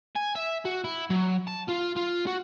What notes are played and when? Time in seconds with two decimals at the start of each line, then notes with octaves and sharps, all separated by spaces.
0.16 G#5
0.36 E5
0.65 F#4
0.84 E4
1.10 F#3
1.47 A5
1.68 F4
1.96 F4
2.27 F#4